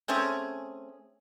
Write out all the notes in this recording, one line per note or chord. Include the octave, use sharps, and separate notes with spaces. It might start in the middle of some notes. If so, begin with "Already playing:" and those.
A3 C4 C#4 G#4